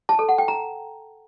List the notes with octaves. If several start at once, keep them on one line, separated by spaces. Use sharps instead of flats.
A5
A4
F#5
G5
A#5